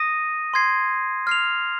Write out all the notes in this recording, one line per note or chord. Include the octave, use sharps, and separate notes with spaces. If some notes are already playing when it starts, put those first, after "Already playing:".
Already playing: D#6 A#6 D#7
C6 G#6 C7
F6 C7 F7